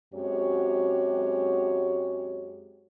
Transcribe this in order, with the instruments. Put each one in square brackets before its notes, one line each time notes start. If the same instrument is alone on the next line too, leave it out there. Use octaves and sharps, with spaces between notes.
[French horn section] F#2 G#3 C4 F#4 G4 C#5